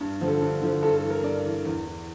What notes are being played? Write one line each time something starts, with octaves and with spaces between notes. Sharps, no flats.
G2
D3 F3
A4
G2
D3 F3
G2 A4
A4
E3
A#4
G2 D5
E3
E2
E3